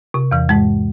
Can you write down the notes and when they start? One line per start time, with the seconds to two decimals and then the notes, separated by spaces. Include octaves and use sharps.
0.14 C3
0.31 E2 E3
0.49 G#2 G#3